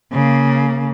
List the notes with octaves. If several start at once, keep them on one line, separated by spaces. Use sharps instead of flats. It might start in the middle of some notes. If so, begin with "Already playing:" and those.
C#3 A#3